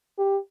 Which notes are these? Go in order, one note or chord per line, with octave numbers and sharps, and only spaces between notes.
G4